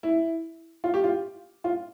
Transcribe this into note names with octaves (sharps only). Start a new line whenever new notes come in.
E4
F4
G4
F4
F4